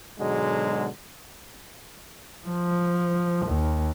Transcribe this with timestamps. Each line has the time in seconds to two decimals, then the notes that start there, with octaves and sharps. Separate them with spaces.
0.19 G#2 B2 D3 F#3 G#3
2.47 F3
3.46 D#2